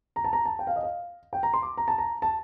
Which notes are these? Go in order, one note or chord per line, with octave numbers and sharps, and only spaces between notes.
A#5
A5
A#5
A5
G5
F5
D#5
F5
G5
A#5
C6
D6
A#5
A5
A#5
A5